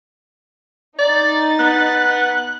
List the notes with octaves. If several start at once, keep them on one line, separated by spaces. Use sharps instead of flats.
D#4 D5 A6
B3 F#6